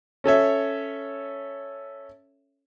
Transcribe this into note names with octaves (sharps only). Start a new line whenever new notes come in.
C#4 A4 C#5 E5